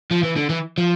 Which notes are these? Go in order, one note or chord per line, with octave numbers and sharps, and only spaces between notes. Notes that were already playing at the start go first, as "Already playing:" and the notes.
F3
E3
D3
E3
F3